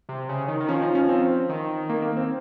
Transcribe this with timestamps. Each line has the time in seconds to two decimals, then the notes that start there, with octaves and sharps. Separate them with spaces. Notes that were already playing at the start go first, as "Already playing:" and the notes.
0.09 C3
0.29 C#3
0.48 D#3
0.60 D#3
0.69 F3 C#4
0.82 D#4
0.95 C#4
1.09 C4
1.49 D#3
1.89 A#3
2.02 A#3
2.17 C4